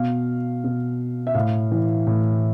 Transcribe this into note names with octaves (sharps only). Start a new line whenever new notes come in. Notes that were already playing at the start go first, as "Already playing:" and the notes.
Already playing: B2 F5
B2
E5
A2 F5
E3
A2